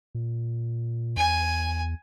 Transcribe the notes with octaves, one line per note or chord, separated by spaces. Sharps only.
A#2
E2 G#5